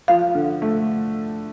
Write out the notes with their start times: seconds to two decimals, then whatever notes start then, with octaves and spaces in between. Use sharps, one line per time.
0.08 F3 F5
0.35 D3
0.62 A3